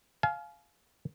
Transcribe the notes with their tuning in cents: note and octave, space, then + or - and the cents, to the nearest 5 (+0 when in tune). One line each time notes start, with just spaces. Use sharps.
F5 +0 G#5 +40